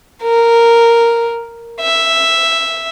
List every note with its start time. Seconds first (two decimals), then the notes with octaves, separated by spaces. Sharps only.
0.23 A#4
1.81 E5